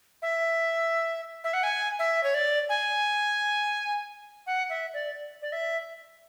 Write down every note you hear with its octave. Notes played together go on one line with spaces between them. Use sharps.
E5
E5
F#5
G#5
E5
C#5
D5
G#5
F#5
E5
D5
D5
E5